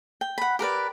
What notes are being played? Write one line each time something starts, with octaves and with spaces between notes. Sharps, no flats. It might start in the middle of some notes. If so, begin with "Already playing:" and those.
G5
F#5 B5
G4 A#4 B4 D5